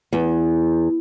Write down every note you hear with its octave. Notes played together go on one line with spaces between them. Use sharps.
E2